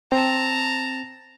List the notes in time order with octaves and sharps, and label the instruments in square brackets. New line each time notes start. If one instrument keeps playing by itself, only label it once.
[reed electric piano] C4 [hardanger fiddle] A5 A#5